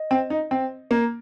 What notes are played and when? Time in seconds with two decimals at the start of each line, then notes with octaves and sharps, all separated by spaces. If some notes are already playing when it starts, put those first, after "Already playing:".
Already playing: D#5
0.11 C4
0.30 D#4
0.51 C4
0.91 A#3